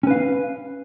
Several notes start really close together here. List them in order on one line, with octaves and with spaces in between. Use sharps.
C#4 B4 F5